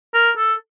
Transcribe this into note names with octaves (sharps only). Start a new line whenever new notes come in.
A#4
A4